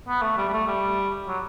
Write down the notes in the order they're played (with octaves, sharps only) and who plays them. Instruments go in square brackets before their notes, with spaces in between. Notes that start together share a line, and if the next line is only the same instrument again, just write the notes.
[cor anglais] B3
A3
G3
G3
A3
G3
F#3